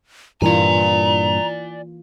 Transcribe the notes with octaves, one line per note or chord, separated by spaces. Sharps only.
G2 A#2 E3 A#3 F4 D5 G#5 A#5